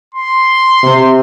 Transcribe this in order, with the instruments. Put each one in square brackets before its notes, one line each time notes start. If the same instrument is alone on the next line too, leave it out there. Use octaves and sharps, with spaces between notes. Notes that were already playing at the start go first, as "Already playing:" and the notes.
[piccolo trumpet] C6
[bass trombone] C3